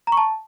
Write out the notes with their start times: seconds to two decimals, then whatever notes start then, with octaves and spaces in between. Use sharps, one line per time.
0.07 A#5
0.12 C#6
0.17 A5